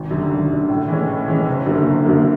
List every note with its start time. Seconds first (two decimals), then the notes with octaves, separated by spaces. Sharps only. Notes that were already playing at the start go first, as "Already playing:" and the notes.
Already playing: G#1
0.11 F#2 D3
0.31 G#1
0.50 F#2 D3
0.69 A2
0.88 E3 G#3 C#4
1.08 A2
1.28 E3 G#3 C#4
1.47 F#1
1.66 F#2 D3 F#3 A#3
1.87 F#1
2.05 F#2 D3 F#3 A#3